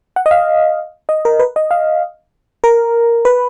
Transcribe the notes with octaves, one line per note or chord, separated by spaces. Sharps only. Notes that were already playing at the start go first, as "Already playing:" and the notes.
F#5
D#5
F5
D#5
A#4
B4
D#5
F5
A#4
B4